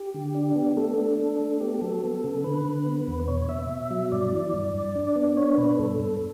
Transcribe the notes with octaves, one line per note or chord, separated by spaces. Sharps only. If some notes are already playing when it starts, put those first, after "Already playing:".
Already playing: G4
D3
D4
B3
A3 A4
D4
D4
A3
B3 G4
G4
F#3 A4
B3
C#3
D3 B4
D3
B3
E2
B2 C#5
B2 E5
B2
F#3
G2 D5
E3
G2
G2
D4
B3
D4 C#5
B2 B4
G2 A4
G2